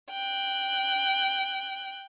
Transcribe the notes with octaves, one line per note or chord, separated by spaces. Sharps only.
G5 F#6